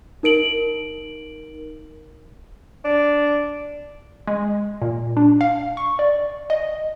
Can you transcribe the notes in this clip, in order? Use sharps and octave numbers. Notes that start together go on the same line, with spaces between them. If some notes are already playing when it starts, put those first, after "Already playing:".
D#4 A#4 D7 F#7
D4
G#3
A#2
D4
F5
C#6
D5
D#5